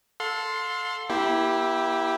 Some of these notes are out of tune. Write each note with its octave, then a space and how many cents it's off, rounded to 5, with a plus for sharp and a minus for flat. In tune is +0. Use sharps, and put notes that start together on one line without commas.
A4 +0 F5 +40 C6 +0
A#3 +40 E4 +0 G4 -5